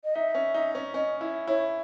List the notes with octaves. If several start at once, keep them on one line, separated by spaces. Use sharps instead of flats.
D#5
D#4 E5
C#4
D#4
C#4
C#4 D#5
E4
E4 C#5